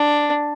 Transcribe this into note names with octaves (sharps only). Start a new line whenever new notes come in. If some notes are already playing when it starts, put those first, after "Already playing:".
Already playing: D4